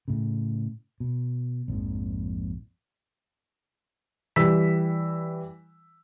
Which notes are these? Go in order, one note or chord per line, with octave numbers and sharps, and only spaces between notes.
A2 C#3
B2
A#1 F2 G#2
E3 G3 E6 B6